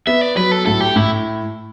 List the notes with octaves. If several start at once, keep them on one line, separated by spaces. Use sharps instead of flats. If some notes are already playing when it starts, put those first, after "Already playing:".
B3 E5
D5
F#3 B4
A4
A2 A4
G4
A2 E4